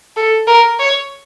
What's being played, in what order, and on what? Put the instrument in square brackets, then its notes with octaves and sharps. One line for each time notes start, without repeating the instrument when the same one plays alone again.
[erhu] A4
A#4
C#5